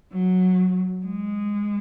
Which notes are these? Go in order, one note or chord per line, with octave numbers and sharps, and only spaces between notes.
F#3
G#3